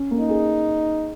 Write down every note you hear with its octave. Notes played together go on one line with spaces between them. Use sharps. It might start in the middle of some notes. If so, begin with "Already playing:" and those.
Already playing: C#4
A#3
D#4
G#4